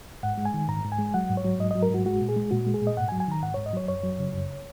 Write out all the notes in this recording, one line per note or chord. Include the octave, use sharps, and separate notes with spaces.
G#2 F#5
G#3
G#5
D#3
G#2 A#5
G#2
G#5
G#3
F#3 F#5
G#2
C#5
F#3
G#2 D#5
F#3 D#5
A#4
G#2 F#4
G#3 F#4
A#2
G#4
G#3
A#2 F#4
G#3
G#4
A#2
D#5
G#2 F#5
G#5
F#3
G#5
D#3 A#5
G#2 F#5
G#2 C#5
D#5
F#3 C#5
F#2 C#5
F#3
C#3
F#2